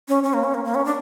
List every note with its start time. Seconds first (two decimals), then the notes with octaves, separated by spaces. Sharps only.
0.08 C#4
0.23 C#4
0.34 A#3
0.44 C#4
0.54 A#3
0.65 A#3
0.75 C#4
0.85 D4